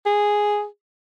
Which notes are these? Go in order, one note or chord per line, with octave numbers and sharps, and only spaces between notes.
G#4